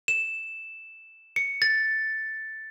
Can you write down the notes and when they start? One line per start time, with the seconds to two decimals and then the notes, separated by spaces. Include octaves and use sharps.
0.08 E7
1.36 C#7
1.62 A6